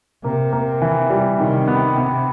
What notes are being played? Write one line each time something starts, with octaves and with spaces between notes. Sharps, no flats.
C3 A#3
A#3
E3
G3
C3 D#3
B3
B3